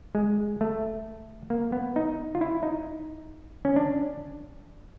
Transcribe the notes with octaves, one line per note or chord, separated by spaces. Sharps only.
G#3
A3
A#3
B3
D#4
F4
E4
D#4
C#4
D4